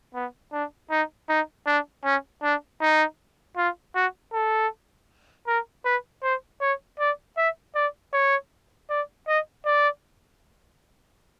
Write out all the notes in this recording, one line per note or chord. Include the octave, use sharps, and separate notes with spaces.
B3
D4
D#4
D#4
D4
C#4
D4
D#4
F4
F#4
A4
A#4
B4
C5
C#5
D5
E5
D5
C#5
D5
D#5
D5